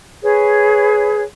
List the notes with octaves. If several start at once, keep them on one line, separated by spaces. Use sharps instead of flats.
G#4 B4 C#5